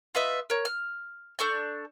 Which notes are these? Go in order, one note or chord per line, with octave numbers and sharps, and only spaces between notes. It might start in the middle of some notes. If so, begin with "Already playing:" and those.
F4 B4 D#5 E5
A#4 C#5
F6
D4 A4 C#6 G6